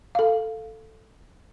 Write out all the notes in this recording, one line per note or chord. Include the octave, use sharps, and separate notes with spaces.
A4 F5